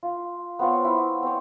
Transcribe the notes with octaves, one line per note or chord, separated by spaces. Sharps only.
F4
B3 C4 F4 C#5
E4
C4 C5 C#5